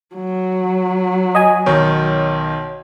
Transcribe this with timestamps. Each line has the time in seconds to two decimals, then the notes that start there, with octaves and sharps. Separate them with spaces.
0.15 F#3
1.35 D#5 G#5
1.66 B1 D#3 C#5